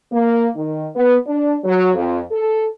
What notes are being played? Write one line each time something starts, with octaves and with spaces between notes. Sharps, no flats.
A#3
D#3
B3
D4
F#3
F2
A4